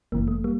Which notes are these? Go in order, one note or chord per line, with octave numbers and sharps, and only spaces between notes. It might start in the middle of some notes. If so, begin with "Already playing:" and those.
G1 F#2 C#3 E3 A#3
A3
G3 A#3